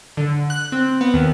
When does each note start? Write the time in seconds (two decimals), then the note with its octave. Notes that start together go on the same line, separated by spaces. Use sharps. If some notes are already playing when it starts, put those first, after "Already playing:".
0.17 D3
0.50 F#6
0.72 C4
1.01 B3
1.14 D#2